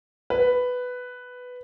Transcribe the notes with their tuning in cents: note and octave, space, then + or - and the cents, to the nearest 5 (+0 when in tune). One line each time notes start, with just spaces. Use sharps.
B4 +5